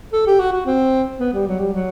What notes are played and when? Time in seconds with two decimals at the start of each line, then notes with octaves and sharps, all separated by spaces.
0.13 A4
0.27 G4
0.40 F#4
0.53 F#4
0.66 C4
1.20 B3
1.33 G3
1.47 F#3
1.59 G3
1.73 F#3